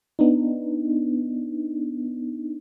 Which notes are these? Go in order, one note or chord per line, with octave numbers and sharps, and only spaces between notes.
B3 D4 D#4